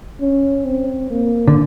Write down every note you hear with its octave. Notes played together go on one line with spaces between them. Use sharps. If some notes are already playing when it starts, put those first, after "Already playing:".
C#4
C4
A#3
D3